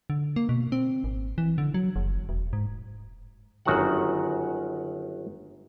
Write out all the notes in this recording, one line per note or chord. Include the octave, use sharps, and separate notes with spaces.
D3
A#3
B2
C4
G#1
E3
D3
F#3
F#1
E1
G#2
G1 F#2 D#3 F#4 F#5